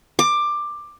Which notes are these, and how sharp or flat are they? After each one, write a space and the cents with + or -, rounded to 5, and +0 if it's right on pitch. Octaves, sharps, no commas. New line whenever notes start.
D6 +15